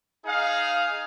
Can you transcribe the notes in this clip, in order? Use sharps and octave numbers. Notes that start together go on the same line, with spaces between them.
D#4 G#4 F5